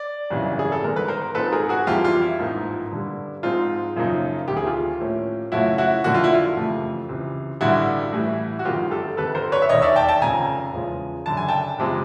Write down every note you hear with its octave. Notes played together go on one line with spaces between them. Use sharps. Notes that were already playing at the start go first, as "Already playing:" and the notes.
Already playing: D5
G#1 F#2 C#3 E3 G3
G#4
A4
G1 G2 D#3 G#3 B3 A#4
B4
A#4 C5
G#2 F3 G#3 C4 D#4 A4 B4
G#4 A#4
F#4 G#4
F2 C3 E3 G3 F4 G4
F4
E4
A1 G#2 F3 A#3 D#4
G2 D3 G3
G#2 F3 G#3 C4 D#4 F4
F#2 C#3 F3 A#3 D#4
D2 C3 D#3 G4
G#4
F4 G4
A2 F3 A#3 C#4
F#2 C#3 F3 A3 C#4 E4 F#4
E4 F#4
F2 D3 F#3 A#3 F#4
F4
E4
F4
F#1 F2 C3 E3 A3
C#2 C3 E3
A1 G2 D3 E4 F#4
A2 E3 G3
F#4
G1 F#2 D#3 G#3 C4 F4 G4
G4 A4
G1 F2 C3 A4 B4
A#4 C5
B4 C#5
E5
E1 D#2 D#3 C#5 D#5
D5 E5
G5 A5
G5 A5
F1 F2 C#3 G#5 A#5
E2 C#3 F3 G#3
F#1 F#2 D3 A5
G#5
G5 A5
F#1 C3 F3 G#3